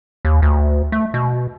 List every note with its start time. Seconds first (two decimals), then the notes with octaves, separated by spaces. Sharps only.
0.25 D#2
0.42 D2
0.92 A3
1.14 B2